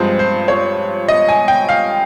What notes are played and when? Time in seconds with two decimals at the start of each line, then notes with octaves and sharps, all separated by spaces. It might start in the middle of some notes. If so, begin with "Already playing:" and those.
Already playing: G2 F3 G#3 C4 C5
0.19 C5
0.48 C#5
1.08 D#5
1.29 G#5
1.48 G5
1.69 F5